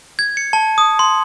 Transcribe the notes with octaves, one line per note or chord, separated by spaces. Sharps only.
G#6
C#7
A5
D#6
C6